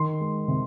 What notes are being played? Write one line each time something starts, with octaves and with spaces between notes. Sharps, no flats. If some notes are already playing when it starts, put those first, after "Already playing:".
Already playing: D#3 C6
G#3
C3